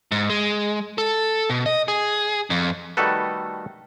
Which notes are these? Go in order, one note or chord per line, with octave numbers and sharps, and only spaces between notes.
G#2
G#3
A4
B2
D#5
G#4
F2
D#3 G3 A3 F#4 A4 B4